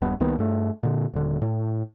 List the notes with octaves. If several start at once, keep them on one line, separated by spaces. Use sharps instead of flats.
D#1 G2 B3
C2 D#3 A#3 B3
G2 A3
A#2 D3
D#1 D3
A2